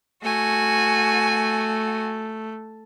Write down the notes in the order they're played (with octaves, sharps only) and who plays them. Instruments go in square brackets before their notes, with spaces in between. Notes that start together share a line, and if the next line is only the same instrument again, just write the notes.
[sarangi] A3 [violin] F#4 G#5